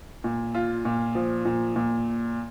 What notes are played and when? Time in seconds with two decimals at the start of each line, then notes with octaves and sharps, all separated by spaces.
0.24 A#2
0.55 F4
0.85 A#2
1.15 F3
1.45 A#2
1.76 A#2